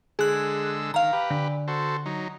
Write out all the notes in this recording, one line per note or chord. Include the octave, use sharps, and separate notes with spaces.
D3 G#3 G#4 E6 F#6
D#3 F5 A#5
G4 B4
D3
F#4 A4 C5
F#3 D#4